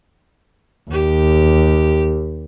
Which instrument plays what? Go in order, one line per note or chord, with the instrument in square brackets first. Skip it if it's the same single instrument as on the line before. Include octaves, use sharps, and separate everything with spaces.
[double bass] D#2 [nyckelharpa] G4